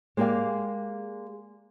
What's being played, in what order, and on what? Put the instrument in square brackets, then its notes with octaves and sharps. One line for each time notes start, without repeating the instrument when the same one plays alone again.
[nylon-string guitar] G#3 A#3 G4 D5 F5